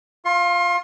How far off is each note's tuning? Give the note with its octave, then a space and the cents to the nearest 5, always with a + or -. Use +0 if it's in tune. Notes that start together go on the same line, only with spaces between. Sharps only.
F4 +0 C6 +35